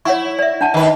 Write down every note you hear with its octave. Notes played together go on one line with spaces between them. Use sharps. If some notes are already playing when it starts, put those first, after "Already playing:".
E4 C#5 F#5 C#6
D5 E5
D4 F#5 A5
D#3 B4